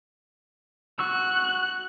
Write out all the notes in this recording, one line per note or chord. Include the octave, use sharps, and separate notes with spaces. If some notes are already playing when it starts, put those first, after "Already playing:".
F#4 C#6 E6 F#6